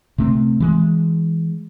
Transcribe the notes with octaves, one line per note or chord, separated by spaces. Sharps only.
C3 A3 C4
E3 G#3